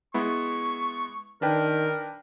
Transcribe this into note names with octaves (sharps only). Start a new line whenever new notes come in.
G#3 B3 E4 C#6
D#3 D4 A#4 B4 G5